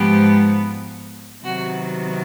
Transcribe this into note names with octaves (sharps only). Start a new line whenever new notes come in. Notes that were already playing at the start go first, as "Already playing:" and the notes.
Already playing: G#2 F3 G#3 B3 G4
C3 D#3 F#3 B3 F#4